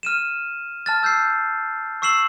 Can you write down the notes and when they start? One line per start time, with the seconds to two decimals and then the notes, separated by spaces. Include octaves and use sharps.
0.03 F6 D#7 E7
0.86 A5 F6 A6
1.03 E6 G6 A6 C7
2.02 C#6 E6 C7 E7 F#7